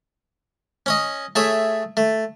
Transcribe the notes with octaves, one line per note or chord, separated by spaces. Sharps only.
C#4 C#5 D#5
A3 G#4 C#5 E5
A3